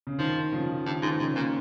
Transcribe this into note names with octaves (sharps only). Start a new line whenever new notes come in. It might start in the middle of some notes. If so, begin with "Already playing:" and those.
C#3
D#3 F3
C#3 F3
G2 D#3
G#2 D#3
G#2 C#3 F3
A#2 A#3 C#4